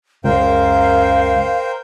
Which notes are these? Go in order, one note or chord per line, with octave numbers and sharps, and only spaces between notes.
C#2 F#2 A#4 C5 F5 G5